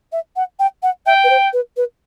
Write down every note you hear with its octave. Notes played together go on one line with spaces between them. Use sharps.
E5
F#5
G5
F#5
E5 G5
B4
C5
B4
B4